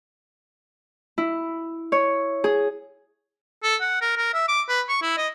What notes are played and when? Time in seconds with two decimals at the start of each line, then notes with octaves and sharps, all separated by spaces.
1.18 E4
1.92 C#5
2.44 G#4
3.63 A4
3.81 F#5
4.02 A#4
4.17 A#4
4.34 E5
4.48 D6
4.68 B4
4.89 C#6
5.02 E4
5.17 D#5